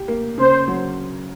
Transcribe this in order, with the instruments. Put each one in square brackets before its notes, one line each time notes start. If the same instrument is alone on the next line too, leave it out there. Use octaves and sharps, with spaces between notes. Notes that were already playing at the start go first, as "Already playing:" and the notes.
Already playing: [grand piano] G4
A#3
[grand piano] C#3 [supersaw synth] C5
[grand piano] F#3